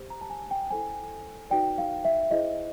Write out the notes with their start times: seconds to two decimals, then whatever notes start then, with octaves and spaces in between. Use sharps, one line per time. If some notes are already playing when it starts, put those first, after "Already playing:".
Already playing: G4 C5
0.10 A#5
0.21 A5
0.30 G#5
0.51 G5
0.70 E4 A4 C5 G#5
1.50 D#4 F#4 B4 D5 G5
1.78 F5
2.05 E5
2.31 E4 G#4 C5 D#5